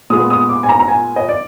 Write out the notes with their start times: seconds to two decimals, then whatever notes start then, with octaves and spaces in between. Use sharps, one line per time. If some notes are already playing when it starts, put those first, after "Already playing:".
0.10 A#2 G#3 B3 D#6
0.30 D#6
0.49 D6
0.63 G#5
0.69 A#5
0.79 A#5
0.88 G#5
1.16 D#5
1.29 D5